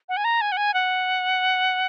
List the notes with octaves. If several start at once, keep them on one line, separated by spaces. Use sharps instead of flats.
F#5
G#5
A#5
G#5
F#5
G#5
F#5